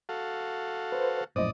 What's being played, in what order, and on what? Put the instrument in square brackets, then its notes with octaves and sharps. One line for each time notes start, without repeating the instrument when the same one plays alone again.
[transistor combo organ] F#4 A4 F5
[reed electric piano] B4 C5
[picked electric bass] A#1 F#2 A2 [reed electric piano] C5 D#5 [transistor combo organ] D5 D#6